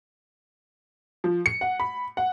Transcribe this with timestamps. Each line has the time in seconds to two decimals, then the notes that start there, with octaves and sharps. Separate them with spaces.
1.24 F3
1.46 C#7
1.61 F#5
1.80 B5
2.17 F#5